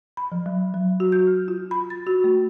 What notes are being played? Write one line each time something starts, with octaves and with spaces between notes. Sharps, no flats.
B5
F3
F#3
F#3
F#4
G6
F6
F4
B5
A6
F#4
A3